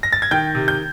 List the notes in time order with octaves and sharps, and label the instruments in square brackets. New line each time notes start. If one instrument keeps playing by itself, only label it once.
[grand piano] A#6
A6
G#6
D#3 G5 G6
C3
G6